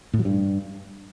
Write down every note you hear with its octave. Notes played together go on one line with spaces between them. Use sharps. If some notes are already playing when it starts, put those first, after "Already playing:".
A2
F#3
G2